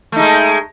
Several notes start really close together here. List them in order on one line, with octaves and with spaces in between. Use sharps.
A3 D#4 G#3